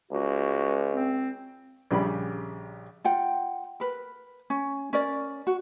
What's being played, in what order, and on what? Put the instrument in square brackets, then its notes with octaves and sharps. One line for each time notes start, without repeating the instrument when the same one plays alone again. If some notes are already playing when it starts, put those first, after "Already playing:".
[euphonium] C#2 [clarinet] F#4
[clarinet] C4
[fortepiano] A#1 C#3 G3 G4 B5
[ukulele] F4 F#5 G5
A#4 B4
C#4
C#4 A#4 D5
F#4